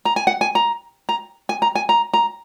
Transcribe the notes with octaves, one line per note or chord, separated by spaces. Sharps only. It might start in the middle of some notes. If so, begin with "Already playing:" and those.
A#5
G#5
F#5
G#5
A#5
A#5
G#5
A#5
G#5
A#5
A#5